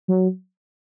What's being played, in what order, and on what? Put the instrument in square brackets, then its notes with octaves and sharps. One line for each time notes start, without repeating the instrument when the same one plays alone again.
[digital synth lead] F#3